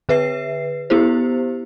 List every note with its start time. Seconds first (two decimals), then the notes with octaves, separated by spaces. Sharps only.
0.09 D3 B4 E5 C7
0.90 B3 E4 G4 C5